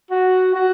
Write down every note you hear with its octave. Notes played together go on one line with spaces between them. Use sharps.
F#4
F#4